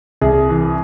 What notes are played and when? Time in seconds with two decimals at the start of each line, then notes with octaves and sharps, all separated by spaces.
0.21 C2 G#4
0.49 E3